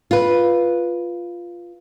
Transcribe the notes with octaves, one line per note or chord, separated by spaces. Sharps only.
F4 B4